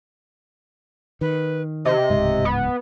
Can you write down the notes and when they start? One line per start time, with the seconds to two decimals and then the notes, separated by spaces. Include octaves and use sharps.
1.21 D#3 B4
1.85 C3 D#5
2.10 D1 C#2 G#2
2.45 B3